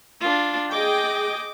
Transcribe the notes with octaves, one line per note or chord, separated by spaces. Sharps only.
D4 F4
G#4 D#5 G5 D6